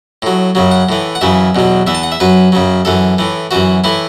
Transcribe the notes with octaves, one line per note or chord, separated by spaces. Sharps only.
A2 F#3
F#2 C#3 F#3
F#5
A2 E3
F#5
F#2 C#3 E3 E5
E2 B2 F#3
E2 E3 E5
A5
F#5
E5
F#2 F#3 B4
F#2 C#3 F#3
F#2 E3 A4
A2 E3
F#2 E3 F#4
A2 E3 E4